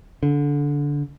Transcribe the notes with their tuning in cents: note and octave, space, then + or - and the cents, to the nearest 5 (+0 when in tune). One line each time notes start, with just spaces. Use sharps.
D3 -20